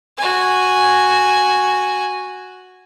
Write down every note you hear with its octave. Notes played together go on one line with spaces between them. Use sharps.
F#4 G#5